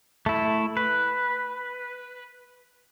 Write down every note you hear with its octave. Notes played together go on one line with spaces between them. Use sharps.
A3 E4
B4